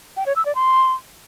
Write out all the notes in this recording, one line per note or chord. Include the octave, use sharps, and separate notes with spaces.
G5
C#5
E6
D5
C6